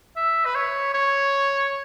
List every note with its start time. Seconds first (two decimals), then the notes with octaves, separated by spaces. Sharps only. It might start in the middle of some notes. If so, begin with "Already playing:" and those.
0.16 E5
0.45 B4
0.55 C#5
0.94 C#5